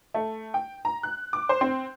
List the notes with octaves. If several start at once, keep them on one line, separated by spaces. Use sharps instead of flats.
A3
G5
A#5
F#6
D6
C5
C4